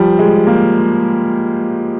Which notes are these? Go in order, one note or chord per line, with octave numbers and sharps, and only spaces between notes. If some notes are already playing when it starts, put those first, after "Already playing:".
Already playing: F3 G3
G#3
A#3